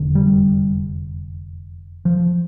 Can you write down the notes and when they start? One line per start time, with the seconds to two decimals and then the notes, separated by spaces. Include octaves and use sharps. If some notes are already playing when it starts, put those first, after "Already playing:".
Already playing: F1 E2 D3
0.15 G3
2.05 F3